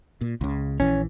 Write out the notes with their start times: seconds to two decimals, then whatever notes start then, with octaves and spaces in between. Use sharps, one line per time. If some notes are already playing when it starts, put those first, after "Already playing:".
0.21 A#2
0.41 C#2 C#3
0.80 A#1 E3 C#4